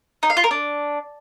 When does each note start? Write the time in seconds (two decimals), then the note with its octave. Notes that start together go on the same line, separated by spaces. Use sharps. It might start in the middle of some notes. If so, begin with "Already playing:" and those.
0.23 D#4
0.30 F5
0.37 F4
0.44 A#4
0.51 D4